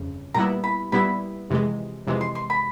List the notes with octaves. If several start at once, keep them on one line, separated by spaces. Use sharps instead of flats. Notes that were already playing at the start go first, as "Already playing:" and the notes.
Already playing: G1 F2 C#3
A#2 G3 B3 E4 A#5
B5
A#2 G3 B3 E4 B5
F2 C3 E3 G#3
F2 C3 E3 G#3
C6
C6
B5